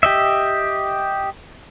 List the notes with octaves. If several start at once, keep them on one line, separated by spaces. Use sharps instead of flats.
G4 D#5 E5